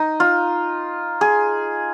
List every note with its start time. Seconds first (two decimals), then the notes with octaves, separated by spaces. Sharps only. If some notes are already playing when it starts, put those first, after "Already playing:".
Already playing: D#4
0.20 F4
1.21 G#4